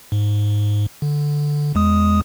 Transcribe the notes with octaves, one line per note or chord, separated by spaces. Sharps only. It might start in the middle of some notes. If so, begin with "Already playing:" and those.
G#2
D3
E2 G#3 D#6